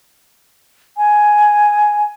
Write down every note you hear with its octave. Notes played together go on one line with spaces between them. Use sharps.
G#5